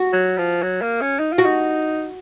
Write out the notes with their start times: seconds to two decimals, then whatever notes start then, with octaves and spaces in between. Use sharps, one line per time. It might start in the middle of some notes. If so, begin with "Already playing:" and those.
Already playing: F#4
0.13 F#3
0.38 F3
0.62 F#3
0.82 A#3
1.01 C#4
1.19 D#4
1.32 F4
1.38 F#4
1.45 D#4